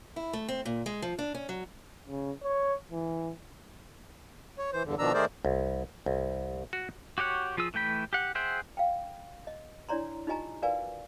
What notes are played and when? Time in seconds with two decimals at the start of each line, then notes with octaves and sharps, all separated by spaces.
0.16 E4
0.33 A3
0.48 C4
0.65 A#2
0.86 G#3
1.02 F3
1.19 D4
1.35 C#4
1.49 F#3
2.08 C#3
2.43 C#5
2.92 E3
4.58 C#5
4.73 E3 C5
4.85 E2 G2 D3
4.99 B2 D#3 F3 D4 A#5 E6
5.14 D#3 A3 G#4 A#4 C5 D5
5.45 C2
6.06 C2
6.73 F#4
7.18 F#4 G4 C#5 F#5
7.57 F3 F4 G#4 E6
7.74 E3 A3 G5 B5
8.13 G4 F#5
8.35 G#4 C5 E5 F#5 G5
8.77 F5 G5
9.47 D#5
9.89 D4 E4 C#5 D5 A#5 C6
10.27 D#4 F4 G4 D#5 G#5 A#5
10.62 F#4 A#4 B4 D5 F5 G#5